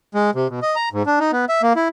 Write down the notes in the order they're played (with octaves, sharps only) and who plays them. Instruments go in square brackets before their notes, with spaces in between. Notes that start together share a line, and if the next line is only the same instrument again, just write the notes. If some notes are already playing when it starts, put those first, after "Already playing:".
[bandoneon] G#3
C3
B2
D#5
A#5
G#2
D4
D#4
B3
E5
A#3
E4